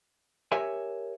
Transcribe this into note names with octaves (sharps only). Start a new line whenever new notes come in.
G4 A#4 C#5 E5 G#5